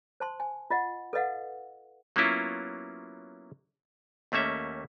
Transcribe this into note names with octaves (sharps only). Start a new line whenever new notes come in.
C5 A5 C6
G#5
F4 D#5 F#5
A4 B4 D#5 F5 F#5
F#3 A#3 B3 C#4 E4 F4
D#2 A3 A#3 C#4 E5